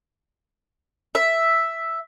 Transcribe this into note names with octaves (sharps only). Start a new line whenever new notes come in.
E5